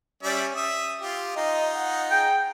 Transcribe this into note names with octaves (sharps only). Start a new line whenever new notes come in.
G3 C#4 D5 E5
E5 D#6
F4 G4
D#4 F4 D#5
F#5
G#4 G5